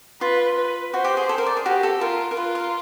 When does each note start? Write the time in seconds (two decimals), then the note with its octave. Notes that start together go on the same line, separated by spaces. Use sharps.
0.21 F4 B4
0.57 B4
0.93 F#4 C5
1.04 G4
1.17 G#4
1.29 A4
1.38 A#4
1.46 D5
1.57 G#4
1.65 F#4 G4
1.83 A4
2.01 F4 A#4
2.31 A#4
2.37 F4 B4
2.55 A#4